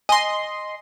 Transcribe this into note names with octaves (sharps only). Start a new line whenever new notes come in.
D#5 G#5 C6